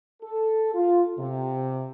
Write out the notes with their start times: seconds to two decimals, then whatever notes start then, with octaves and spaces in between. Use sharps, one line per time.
0.22 A4
0.75 F4
1.19 C3